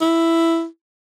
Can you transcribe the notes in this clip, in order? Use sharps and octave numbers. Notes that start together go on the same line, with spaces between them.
E4